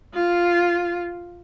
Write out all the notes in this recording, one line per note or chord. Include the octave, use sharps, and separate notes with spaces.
F4